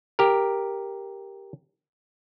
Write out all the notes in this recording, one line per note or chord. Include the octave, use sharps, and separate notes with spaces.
G4 A#4